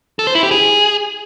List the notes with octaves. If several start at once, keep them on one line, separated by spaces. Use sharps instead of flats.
A4
C5
E4
G4
G#4